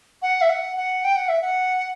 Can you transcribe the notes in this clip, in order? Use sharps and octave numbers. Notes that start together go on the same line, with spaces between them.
F#5
E5
F#5
F#5
G5
F#5
E5
F#5